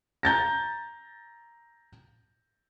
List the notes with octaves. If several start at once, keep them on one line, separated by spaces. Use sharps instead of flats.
A#5 G6 A6 A#6